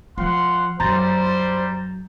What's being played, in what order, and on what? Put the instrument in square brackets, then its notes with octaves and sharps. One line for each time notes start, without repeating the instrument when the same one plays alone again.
[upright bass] F3 [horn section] F5 F#5 C6
[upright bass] F#2 [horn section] G3 C5 [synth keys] A#5 G6 A6